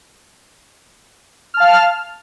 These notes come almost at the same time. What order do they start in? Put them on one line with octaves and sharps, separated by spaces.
F6 A5 F5